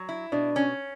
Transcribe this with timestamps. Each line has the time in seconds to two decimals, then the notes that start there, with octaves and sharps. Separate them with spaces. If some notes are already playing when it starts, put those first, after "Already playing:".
Already playing: F#3
0.09 E4
0.32 B2 D4
0.56 C#4